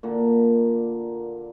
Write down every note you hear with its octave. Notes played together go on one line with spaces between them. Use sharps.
A#2 D3 A#3